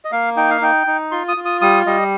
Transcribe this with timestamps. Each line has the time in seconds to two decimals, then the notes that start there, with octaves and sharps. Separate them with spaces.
0.05 D#5
0.12 A#3 F5
0.36 D#4 G5
0.50 F5
0.61 D#4 G5
0.87 D#4
1.11 F4 C6
1.28 D#6
1.37 F4
1.45 D#6
1.61 G3 D#6
1.86 G3 D#5